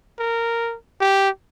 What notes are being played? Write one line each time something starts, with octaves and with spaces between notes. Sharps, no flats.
A#4
G4